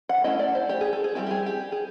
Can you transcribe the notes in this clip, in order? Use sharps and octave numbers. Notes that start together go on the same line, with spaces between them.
F#5
A3 C#4 E4 D#5
D5
C5
G4
G#4
A4
G#4
G3 C4 E4 G4
G4
G#4
G4
G#4